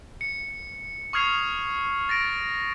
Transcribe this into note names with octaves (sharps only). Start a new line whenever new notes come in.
C#7
C#6 D#6 F6 G#6 C7 F7
A6 A#6 D7